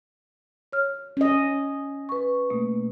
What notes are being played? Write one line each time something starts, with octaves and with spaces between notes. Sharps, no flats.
C#5 F6
C#4 D#5
B4 C#6
B2 A3 A#3